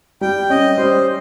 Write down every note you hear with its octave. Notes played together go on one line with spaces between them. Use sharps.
G3 G5
C#4 D#5
G3 C5